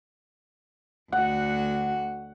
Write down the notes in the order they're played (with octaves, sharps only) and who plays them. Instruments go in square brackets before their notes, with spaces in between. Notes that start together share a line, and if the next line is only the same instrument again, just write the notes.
[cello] D2 F#4 [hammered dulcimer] F#5